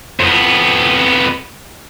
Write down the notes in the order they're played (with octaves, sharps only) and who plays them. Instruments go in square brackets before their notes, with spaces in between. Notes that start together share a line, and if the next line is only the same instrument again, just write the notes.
[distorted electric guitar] F2 B3